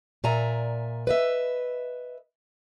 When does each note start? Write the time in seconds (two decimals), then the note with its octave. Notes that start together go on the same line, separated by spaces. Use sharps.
0.24 A#2 D5 E5 G#5 A#5
1.07 B4 D#5 E5